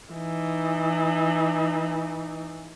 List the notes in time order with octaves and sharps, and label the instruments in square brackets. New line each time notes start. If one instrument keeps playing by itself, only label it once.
[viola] E3 D#4